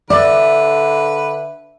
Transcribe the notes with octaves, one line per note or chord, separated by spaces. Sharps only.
D3 B4 D5 E5